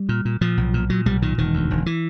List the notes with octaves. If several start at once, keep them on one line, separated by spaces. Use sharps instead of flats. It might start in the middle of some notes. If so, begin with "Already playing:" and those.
Already playing: G3
A#2
A#2
A#2 F3
B1
A#2
A#2 F#3
B1 G3
A#2 D#3
E1 D#3
D2
E1
E3